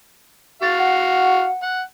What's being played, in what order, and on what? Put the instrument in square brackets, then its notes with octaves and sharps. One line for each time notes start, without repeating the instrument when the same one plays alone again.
[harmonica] F#4 F5 [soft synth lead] A6
[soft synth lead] F#5
[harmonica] F#5